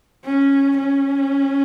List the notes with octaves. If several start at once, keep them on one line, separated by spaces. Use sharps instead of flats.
C#4
C#4